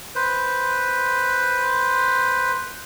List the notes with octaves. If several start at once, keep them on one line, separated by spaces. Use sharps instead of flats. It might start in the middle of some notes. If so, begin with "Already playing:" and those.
B4 C5